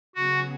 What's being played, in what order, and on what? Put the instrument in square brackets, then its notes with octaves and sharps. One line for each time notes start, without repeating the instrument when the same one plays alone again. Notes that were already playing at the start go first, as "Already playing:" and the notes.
[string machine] C#3 F#3 B3 G#4 [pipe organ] F#4